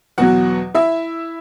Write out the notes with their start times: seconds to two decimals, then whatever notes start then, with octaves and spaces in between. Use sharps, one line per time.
0.18 E2 B2 F#3 F#4 F#5
0.74 E4 E5